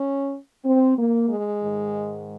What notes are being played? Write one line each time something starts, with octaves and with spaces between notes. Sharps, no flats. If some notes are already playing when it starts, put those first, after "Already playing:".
Already playing: C#4
C4
A#3
G#3
G#2 D#3